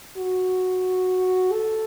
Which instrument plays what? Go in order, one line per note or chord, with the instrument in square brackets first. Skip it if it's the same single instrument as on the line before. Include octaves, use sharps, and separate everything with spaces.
[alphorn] F#4
A4